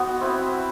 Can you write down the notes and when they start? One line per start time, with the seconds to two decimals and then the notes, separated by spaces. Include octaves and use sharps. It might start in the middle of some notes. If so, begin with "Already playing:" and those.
Already playing: B3 D#4 F#4 C5 D#5
0.20 C4 E4 B4